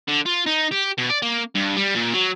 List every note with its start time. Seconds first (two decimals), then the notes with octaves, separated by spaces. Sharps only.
0.08 D3
0.26 F4
0.46 D#4
0.72 G4
0.98 B2
1.10 D5
1.22 A#3
1.55 G2
1.76 G3
1.95 A#2
2.14 F#3